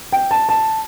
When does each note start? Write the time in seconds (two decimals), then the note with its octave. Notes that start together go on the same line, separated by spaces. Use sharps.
0.12 G5
0.31 A5
0.49 A5